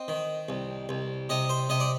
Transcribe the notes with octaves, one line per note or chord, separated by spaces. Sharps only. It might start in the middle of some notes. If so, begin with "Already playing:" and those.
Already playing: C4 D#5
D#3
C2
C2
C3 D#5
C5
C3 D#5
D5